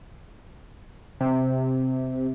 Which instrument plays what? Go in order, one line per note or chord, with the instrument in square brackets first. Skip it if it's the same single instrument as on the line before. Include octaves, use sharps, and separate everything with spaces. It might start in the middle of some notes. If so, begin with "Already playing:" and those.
[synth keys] C3